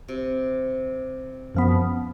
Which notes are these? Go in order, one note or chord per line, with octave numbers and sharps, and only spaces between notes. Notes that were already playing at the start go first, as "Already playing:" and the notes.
C3
F#2 F3 B3